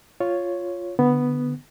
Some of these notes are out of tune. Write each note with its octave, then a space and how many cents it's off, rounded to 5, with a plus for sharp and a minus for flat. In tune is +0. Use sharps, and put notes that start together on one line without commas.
F4 +0 C#5 +0
D3 +0 B3 +0